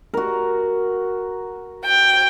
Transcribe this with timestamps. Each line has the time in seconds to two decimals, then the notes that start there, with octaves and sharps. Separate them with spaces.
0.14 F#4 A#4
1.85 G5